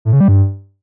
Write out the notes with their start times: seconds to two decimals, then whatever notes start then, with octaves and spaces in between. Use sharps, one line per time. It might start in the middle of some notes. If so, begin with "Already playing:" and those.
0.05 A2
0.13 C#3
0.20 G3
0.28 G2